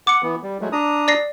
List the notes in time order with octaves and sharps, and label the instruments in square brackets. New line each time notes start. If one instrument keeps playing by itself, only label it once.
[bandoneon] F#5 [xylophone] D6 C#7
[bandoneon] E3 B3
G3
F#3 G#3 A3
D4 A#5 D#6
[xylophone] D5 A#6 C7